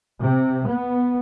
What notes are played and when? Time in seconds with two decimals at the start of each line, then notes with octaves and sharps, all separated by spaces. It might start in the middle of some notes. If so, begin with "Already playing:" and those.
0.22 C3
0.70 B3